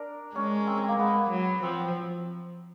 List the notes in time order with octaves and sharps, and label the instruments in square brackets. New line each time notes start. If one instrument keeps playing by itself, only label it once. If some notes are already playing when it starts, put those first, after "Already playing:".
Already playing: [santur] D4 A#4
[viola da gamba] G#3 [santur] C#4
[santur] C4
C4
A#3
[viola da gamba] G#3 [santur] B3
[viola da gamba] F#3
[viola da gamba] F3 [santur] C4